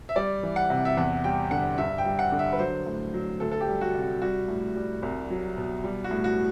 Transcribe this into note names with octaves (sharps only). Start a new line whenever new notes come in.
E5
G3 D5
E3
F#5
C3
E5
E2 F#5
G3 G5
D3 F#5
G2 E5
G5
G3
F#5
D3
E5
B4
F#3 C5
A2
F#3
D2 A4
A4
G4
G3
F#4
C3
F#4
G3 F#4
A2
G3
C2
F#3
B2
G3
F#4
A2
F#4